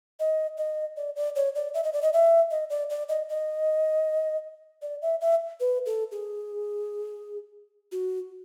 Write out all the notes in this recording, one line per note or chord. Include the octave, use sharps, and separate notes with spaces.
D#5
D#5
D5
D5
C#5
D5
E5
D#5
D5
D#5
E5
D#5
D5
D5
D#5
D#5
D5
E5
E5
B4
A4
G#4
F#4